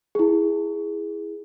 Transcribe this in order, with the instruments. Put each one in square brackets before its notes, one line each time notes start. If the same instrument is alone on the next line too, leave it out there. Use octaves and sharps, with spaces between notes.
[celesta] E4 G#4